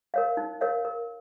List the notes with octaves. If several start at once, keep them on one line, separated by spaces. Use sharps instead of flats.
A#4 C#5 F5
D#4
A#4 C#5 F5
A#4